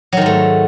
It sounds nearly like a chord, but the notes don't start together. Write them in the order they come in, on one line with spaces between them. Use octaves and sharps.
F#3 D#3 G#2 A3